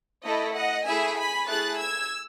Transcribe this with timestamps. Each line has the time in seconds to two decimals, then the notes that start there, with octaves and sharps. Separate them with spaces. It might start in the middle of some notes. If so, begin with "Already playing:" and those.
0.25 A3 E4 A4 D#5
0.55 D#5 F#5
0.86 A3 E4 G#4 E5 G#5
1.18 G#5 B5
1.48 A3 E4 G#4 F#6 A6
1.79 E6 G#6